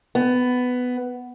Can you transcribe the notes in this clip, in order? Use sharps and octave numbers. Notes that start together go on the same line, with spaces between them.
B3